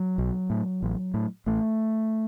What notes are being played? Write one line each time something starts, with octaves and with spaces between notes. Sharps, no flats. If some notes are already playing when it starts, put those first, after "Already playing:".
Already playing: F#3
B1
A2
A1
A2
A1 A3